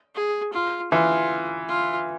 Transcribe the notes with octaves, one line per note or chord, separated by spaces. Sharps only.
G#4
F4
E3 F4
F4